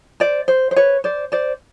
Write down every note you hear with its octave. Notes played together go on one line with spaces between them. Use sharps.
C5 D5
C5
C5
B4 C#5
C5 D5
C5 D5